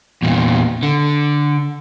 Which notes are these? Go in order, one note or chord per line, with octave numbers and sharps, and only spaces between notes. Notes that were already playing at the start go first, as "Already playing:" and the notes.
E2 A#2
D3